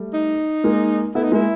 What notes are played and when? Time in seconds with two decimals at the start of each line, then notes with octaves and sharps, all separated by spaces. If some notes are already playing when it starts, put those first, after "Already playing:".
Already playing: G3 A3
0.14 D#4
0.64 G#3 A#3
1.14 A3 B3 E4
1.23 D#4
1.32 G#3 A#3 E4